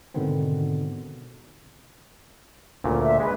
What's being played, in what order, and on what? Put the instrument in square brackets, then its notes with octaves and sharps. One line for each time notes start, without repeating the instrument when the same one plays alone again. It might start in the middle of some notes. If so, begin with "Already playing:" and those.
[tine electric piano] G#2 B2 D3 D#3 B3 C4
[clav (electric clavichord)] D2 A#2 C#3
[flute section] E5
[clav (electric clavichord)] G#3 [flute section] B4